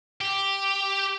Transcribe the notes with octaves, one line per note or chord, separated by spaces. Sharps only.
G4